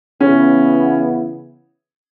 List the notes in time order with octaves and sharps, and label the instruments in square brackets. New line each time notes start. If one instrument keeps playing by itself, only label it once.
[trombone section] C#3 E3 B3 E4 [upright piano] C#4